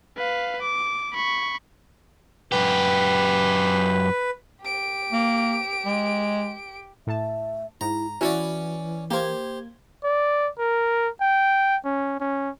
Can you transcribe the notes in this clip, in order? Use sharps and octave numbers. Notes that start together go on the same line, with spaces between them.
B4 F5
D6
B5 C#6
F#2 G4 B4
G4 D7
A#3
G#3
A2 E5 A5
G#2 E4 A#5
E3 C#4 E4 F#4 C#5 D5
A#3 G4 C5 G#6
D5
A#4
G5
C#4
C#4